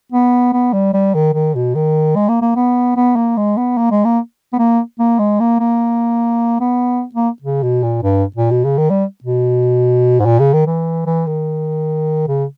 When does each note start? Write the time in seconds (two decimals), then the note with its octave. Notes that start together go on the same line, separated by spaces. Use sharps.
0.12 B3
0.53 B3
0.73 G3
0.94 G3
1.15 D#3
1.34 D#3
1.55 B2
1.75 D#3
2.16 G#3
2.29 A#3
2.42 A#3
2.56 B3
2.96 B3
3.16 A#3
3.37 G#3
3.58 B3
3.78 A#3
3.91 G#3
4.05 A#3
4.53 B3
4.59 A#3
5.00 A#3
5.19 G#3
5.40 A#3
5.60 A#3
6.61 B3
7.15 A#3
7.42 C#3
7.63 B2
7.83 A#2
8.03 G2
8.36 A#2
8.51 B2
8.65 C#3
8.78 D#3
8.90 G3
9.24 B2
10.20 G#2
10.26 A#2
10.40 C#3
10.54 D#3
10.67 E3
11.07 E3
11.27 D#3
12.28 C#3